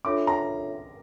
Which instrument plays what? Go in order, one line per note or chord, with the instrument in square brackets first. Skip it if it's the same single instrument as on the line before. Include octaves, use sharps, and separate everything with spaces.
[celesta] D4 F4 A4 C#5 E5 [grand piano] D6
[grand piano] A#5